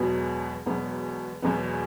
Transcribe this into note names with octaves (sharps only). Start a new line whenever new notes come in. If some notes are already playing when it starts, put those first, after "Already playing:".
Already playing: E1 E2 B2 F#3 B3
E1 E2 B2 F#3 B3
E1 E2 B2 F#3 B3